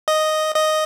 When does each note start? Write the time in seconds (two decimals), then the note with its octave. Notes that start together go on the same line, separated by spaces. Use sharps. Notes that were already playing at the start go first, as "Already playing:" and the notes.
0.08 D#5
0.56 D#5